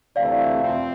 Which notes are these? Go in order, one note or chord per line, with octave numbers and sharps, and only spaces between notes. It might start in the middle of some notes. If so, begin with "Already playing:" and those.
D2 C3 E3 A3 E4 D5 F5
F2 C3 F3 C4